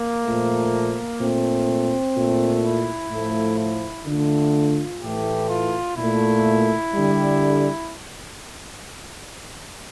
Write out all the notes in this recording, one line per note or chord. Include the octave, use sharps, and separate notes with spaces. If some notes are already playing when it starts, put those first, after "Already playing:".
Already playing: A#3
A#2 F3 A3
A#2 A3 C4
A#2 A3
E4
A2 F3 A3
E4
D3 A3 F4
A2 E3 A3 G4
F4
A#2 A3 E4
D3 G3